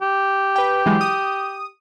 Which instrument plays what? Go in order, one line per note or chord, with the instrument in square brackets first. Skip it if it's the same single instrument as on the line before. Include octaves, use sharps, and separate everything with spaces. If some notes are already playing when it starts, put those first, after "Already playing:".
[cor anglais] G4
[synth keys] B4 G5
E3 F#3 G#3
D#6